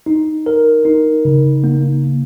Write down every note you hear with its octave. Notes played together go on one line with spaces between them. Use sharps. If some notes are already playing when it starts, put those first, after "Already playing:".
D#4
A#4
D#4
C#3
A#3